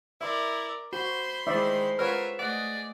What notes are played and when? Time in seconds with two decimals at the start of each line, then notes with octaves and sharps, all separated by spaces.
0.21 E4 A#4 D5 E5 C6
0.93 F#4 C5 B5 C6
1.47 D#3 G#3 E4 C5 D5 E5
1.99 F4 A#4 B4 C#5 E5 F#5
2.39 A3 G#4 D5 D#5 F#5